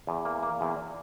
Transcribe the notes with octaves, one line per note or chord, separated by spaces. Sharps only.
E2
A#3
A#3
E2